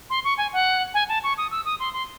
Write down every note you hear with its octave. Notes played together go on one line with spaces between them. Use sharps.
C6
C#6
G#5
F#5
G#5
A5
C#6
D#6
E6
D#6
C6
C6